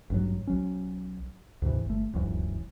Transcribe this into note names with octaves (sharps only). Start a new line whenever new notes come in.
A1 G2 F#3
B1 F#3 C#4
D2 G#2 C3 E3
G1 A3
D1 C#2 F#2 E3